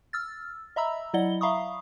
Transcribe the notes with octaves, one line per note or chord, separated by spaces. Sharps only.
E6 F6 A6
D#5 E5 A#5 B5 E6
F#3 E4 D5 D#5 F#5 G7
E5 F5 A#5 B5 C#6 D#6